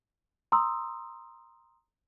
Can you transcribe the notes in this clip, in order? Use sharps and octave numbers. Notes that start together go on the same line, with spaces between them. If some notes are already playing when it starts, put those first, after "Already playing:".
A#5 C6 D#6 E6